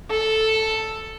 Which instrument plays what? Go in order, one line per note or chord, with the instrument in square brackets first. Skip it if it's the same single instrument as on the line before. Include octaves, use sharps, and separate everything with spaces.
[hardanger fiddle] A4